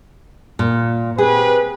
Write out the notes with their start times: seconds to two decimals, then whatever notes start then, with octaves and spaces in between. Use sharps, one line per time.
0.59 A#2
1.18 C4 G4 G#4 B4